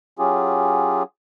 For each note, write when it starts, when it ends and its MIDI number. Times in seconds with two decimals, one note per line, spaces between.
0.19 1.03 54
0.19 1.03 61
0.19 1.03 65
0.19 1.03 67
0.19 1.03 68